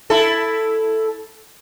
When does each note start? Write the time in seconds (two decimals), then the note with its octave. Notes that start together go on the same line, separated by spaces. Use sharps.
0.10 E4 A4